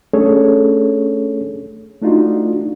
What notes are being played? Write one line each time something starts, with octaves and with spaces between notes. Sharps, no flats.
A3 C#4 D4 G#4 A4 C#5
A3 D4 D#4 F4 F#4